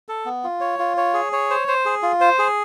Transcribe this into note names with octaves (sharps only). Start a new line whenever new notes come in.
A4
B3
F4
C#5
F4
C#5
G#4
C#5
C5
C5
G#4
F4
C5
G#4